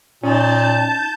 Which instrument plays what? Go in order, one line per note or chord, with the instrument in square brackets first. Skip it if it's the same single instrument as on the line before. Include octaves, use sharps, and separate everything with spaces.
[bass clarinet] A#2 [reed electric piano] C#4 D#4 [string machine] A5 G6